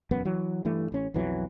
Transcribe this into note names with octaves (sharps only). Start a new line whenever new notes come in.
E1 F#2 B3
E3 F#3
G2 E3 A3
A1 C#4
B1 F2 E3 F#3